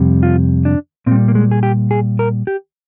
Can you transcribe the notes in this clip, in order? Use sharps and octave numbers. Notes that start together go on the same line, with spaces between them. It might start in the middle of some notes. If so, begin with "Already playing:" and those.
Already playing: F2 C3 G3
F4
D4
A#2 C4
G3
A#3
G#3
G#4
G4
G#4
A#4
G4